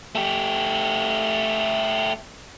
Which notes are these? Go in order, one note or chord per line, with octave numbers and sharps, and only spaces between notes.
A3 G4